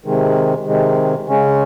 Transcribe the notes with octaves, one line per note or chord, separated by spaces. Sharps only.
C3 D#3 G#3
C3 D#3 G#3
C#3 G#3 C#4